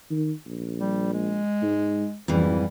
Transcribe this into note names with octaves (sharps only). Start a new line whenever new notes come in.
D#3
A#1
G3
G#3
G#2
F#1 F2 G#2 E3 G3